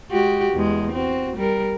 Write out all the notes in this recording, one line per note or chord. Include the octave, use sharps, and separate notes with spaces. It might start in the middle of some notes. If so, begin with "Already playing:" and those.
G#3 F#4 G4
E2 G#3
C4 F#4
G3 A#4